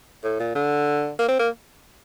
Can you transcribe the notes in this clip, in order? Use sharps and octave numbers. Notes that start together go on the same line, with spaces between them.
A2
A#2
D3
A#3
C4
A#3